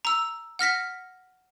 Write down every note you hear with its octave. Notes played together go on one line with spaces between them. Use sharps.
A#5 E6
F#5 F6 A#6 B6